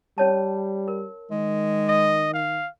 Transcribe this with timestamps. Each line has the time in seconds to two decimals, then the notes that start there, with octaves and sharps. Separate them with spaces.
0.18 G3 C#4 C#5 A5
0.88 A#4
1.31 D#3 G#3
1.88 D#5
2.34 F5